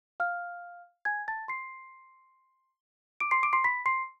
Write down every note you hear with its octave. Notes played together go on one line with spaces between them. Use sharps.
F5 F6
G#5 G#6
A5 A6
C6 C7
D6 D7
C6 C7
D6 D7
C6 C7
B5 B6
C6 C7